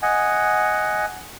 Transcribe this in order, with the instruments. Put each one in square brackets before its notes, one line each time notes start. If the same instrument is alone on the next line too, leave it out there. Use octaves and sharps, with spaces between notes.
[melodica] D#5 F#5 G#5